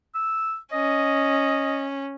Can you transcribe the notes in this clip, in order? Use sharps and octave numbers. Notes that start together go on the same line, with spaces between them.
E6
C#4 D#5